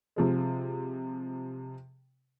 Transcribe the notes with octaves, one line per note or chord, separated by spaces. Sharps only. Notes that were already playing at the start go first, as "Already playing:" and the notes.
C3 F3 G#3